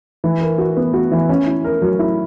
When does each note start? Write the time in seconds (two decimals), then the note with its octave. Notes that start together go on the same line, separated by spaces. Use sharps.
0.24 E3
0.41 A#4
0.58 F#4
0.77 B3
0.94 F#4
1.12 E3
1.29 C#4
1.47 E4
1.64 A#4
1.82 F#3
1.99 E4